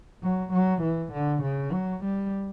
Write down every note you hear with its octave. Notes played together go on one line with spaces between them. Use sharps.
F#3
F#3
E3
D3
C#3
F#3
G3